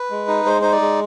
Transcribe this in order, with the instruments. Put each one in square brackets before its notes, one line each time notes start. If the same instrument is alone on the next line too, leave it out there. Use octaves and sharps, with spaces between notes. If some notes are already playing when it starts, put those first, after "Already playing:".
Already playing: [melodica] B4
G#3
D#4
G#3 C5
D#4 C5
D5
G#3